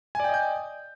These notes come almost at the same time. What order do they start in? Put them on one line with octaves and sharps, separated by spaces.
G#5 D5 G5 D#5 G6